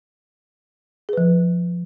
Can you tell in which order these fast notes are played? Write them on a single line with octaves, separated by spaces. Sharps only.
G#4 B4 F3